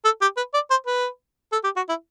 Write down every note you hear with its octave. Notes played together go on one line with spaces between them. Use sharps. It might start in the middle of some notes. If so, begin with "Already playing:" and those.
A4
G4
B4
D5
C5
B4
A4
G4
F#4
E4